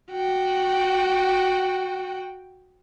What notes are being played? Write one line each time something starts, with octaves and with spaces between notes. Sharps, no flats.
F#4 G5